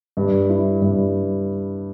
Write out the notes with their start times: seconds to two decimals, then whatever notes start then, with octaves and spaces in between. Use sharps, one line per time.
0.17 G2
0.49 E4
0.82 G2